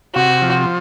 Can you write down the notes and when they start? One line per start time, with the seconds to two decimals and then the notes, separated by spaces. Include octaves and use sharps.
0.15 C3 F#4
0.42 F3